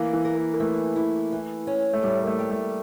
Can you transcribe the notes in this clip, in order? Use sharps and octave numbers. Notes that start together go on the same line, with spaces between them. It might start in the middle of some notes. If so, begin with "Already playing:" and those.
Already playing: E3 A#3
E3
A#4
A#3
A#3
E3 A3
E4
E3
C#4
A3
A2 G3
A#3
A3
G3
A3